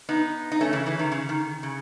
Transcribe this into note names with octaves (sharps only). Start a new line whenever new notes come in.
B3 D#4
D#4
A3 C#4
C#3 E3
C#3 E3
D#3
C#3
D#3
C#3